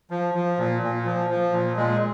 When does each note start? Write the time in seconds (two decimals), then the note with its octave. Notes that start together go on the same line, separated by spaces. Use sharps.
0.11 F3
0.34 F3
0.58 A#2
0.83 A#2
1.05 F3
1.30 F3
1.53 A#2
1.76 A#2 G#3